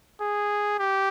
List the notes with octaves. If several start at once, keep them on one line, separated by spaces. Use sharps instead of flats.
G#4
G4